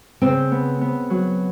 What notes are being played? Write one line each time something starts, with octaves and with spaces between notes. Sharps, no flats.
C#3 C4
B3
B3
F#3